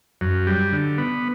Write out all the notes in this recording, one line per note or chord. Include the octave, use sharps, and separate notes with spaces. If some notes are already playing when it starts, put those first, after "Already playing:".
F#2
G3
D3
B3